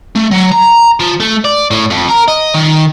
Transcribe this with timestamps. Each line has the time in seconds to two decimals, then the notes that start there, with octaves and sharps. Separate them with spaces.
0.15 A3
0.31 F#3
0.52 A#5
1.00 F3
1.20 A3
1.45 D5
1.71 A2
1.90 F2
2.08 A#4
2.28 D#5
2.54 D#3